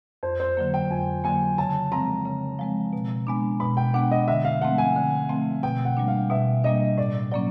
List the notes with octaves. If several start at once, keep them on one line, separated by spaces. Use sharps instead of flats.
F2 C5
C5
D3 F#3 A#3
G5
F2 G#5
D3 F#3 A#3 G#5
C#3 A5
F3 G#3 C4 A#5
C#3
F3 G#3 C4
B2
G#3 B3 D4
B2 B5
G5
G#3 B3 D4 F#5
D#5
D3 E5
F5
F3 A3 C4 F#5
G#5
D3
F3 A3 C4
B2 G5
F#5
G3 A#3 D4
F5
B2 E5
G3 A#3 D4 D#5
A2 D5
F#3 A#3 C#4 D5